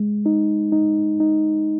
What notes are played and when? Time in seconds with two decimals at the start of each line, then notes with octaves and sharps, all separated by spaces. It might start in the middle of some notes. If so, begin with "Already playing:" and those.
Already playing: G#3
0.26 D#4
0.72 D#4
1.20 D#4